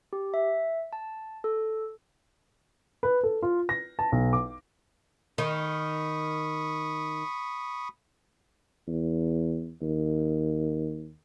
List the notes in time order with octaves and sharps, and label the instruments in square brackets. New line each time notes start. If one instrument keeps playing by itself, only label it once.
[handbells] G4
E5
A5
A4
[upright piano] B4
A4
F4
A#6
A5
B1
D6
[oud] D#3 [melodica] B5 C#6 D#6
[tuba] E2
D#2